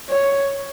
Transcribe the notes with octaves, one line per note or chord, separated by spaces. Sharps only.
C#5